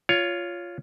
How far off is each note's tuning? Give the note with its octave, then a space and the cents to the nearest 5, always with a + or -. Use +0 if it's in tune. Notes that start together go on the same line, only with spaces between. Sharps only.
F4 +0 C#5 +15